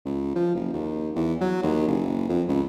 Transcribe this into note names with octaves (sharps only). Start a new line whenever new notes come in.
C#2
F3
F#1
D#2
E2
F#3
D#2
F#1
F2
C#2